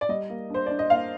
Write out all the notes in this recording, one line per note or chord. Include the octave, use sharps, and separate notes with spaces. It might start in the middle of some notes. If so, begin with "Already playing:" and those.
D5
G3 D#5
A#3
D4 C5
D4 D5
D#5
A#3 F5